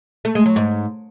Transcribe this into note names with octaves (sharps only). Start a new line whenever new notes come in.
A3
G#3
F#3
G#2